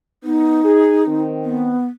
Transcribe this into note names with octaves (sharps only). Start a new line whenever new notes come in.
B3 D#4
G#4
D#3 C4
B3